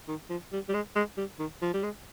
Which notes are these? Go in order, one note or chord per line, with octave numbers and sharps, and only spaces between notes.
D#3
F3
G3
G3
G#3
G#3
G3
D#3
F3
G3
G#3